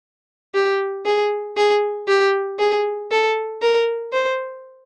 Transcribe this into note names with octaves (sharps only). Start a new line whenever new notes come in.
G4
G#4
G#4
G4
G#4
A4
A#4
C5